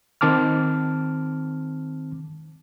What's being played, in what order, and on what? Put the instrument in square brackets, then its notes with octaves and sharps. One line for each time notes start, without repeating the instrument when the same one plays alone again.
[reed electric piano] D#3 C4 A5 D6 F6